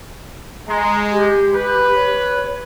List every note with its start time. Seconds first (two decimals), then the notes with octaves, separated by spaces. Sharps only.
0.68 G#3 A#5
1.12 G4
1.53 B4
1.95 C#5